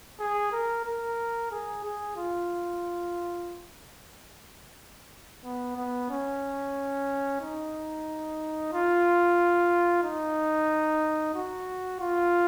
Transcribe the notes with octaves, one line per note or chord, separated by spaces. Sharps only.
G#4
A#4
A#4
G#4
G#4
F4
B3
B3
C#4
D#4
F4
D#4
F#4
F4